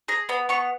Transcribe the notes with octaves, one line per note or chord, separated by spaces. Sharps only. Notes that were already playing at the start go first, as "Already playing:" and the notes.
G#4 A#5
B3 B5
B3 C#6